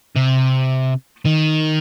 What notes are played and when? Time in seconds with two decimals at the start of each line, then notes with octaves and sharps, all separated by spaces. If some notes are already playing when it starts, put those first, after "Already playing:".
0.16 C3
1.26 D#3